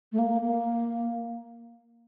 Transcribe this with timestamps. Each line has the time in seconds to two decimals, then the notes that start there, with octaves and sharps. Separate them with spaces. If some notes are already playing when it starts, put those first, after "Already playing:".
0.12 A3
0.19 A#3
0.42 A#3